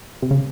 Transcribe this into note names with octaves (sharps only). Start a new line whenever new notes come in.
C3
C#3